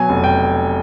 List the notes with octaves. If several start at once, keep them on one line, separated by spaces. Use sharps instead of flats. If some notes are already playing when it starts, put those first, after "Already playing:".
Already playing: B2 F#3 G#5
F1
G5